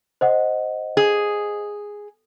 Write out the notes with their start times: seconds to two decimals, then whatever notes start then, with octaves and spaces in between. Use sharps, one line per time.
0.21 C5 D#5 F#5
0.97 G#4